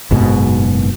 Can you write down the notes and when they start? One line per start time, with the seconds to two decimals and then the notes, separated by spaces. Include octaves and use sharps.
0.11 F#1 G#2 B2